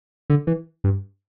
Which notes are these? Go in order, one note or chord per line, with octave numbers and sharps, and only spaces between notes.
D3
E3
G2